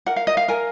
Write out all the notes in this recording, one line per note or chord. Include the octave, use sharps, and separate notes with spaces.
A#4 F#5
F5
D#5
F5
A#4 G#5